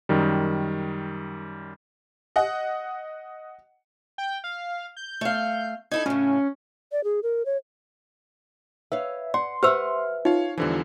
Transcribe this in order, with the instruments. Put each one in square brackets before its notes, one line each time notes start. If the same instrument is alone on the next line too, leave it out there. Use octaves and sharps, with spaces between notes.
[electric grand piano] F#2 D#3 G3
[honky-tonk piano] D#5 F#5
[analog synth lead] G5
F5
G6
[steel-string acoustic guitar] A3 F5
[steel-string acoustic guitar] D#4 E4 A4 [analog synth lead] G#6
[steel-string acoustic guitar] A2 C#3 [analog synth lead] C#4
[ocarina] D5
G#4
A#4
C#5
[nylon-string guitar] B4 C#5 F5 [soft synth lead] E5
[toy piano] D5 [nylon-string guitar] F#5 [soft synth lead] C6
[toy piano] G4 C5 E6 [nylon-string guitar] B4 E5 F#5 [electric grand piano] F6
[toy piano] D#4 [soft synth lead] F4 [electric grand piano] C#5 F5
[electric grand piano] E2 D3 E3 [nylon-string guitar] F3 G3